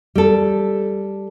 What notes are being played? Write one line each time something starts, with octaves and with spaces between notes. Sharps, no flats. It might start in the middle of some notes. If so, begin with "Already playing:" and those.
G3 A4